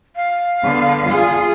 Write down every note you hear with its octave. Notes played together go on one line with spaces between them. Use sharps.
F5
D3 B3
F4 G#4